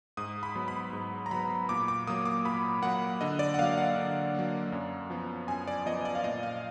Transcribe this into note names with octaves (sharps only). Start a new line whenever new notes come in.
G#2 D#6
B5
F#3 B3
B5
G#2
A#5
F#3 B3 B5
A#2 D6
D6
F#3 A#3 D#6
D6
A#2 B5
F#3 A#3 F#5
D3 D#5
D5
F#5
F#3 A#3 F5
F#5
D3
F#3 A#3
F#2
F3 B3
F#2 G#5
D5
F3 B3 D#5
D5
F5
A#2 D#5
F5